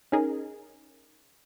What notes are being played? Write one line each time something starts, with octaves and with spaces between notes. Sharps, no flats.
C#4 D#4 G#4 A#4